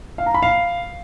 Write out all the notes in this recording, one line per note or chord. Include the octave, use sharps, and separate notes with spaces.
F5
A#5
B5
F5